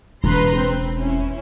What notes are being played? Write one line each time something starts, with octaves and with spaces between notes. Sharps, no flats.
E1 B4 A#5 C6
C4
C#4 E4